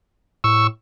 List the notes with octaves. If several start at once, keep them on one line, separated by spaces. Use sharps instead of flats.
A2 C#6 E6